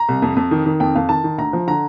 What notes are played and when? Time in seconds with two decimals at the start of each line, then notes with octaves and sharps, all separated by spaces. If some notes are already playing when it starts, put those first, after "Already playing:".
Already playing: A#5
0.08 C2
0.22 F2
0.37 F2
0.51 D#3
0.66 D#3
0.80 F2 G5
0.95 F2 F5
1.09 D#3 A5
1.24 D#3
1.38 D2 A#5
1.53 F3
1.67 D3 A#5